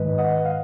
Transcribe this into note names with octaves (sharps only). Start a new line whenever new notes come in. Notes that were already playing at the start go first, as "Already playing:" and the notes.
Already playing: G#2 D#3 G#3 B4 D#5
D#5 F#5
F5